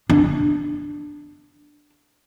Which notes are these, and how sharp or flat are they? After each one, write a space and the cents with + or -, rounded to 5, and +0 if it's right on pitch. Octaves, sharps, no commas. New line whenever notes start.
D4 +5